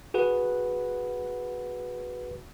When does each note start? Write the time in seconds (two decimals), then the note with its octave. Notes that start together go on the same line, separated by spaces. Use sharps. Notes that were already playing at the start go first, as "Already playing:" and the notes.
0.14 F#4 G#4 B4 F#5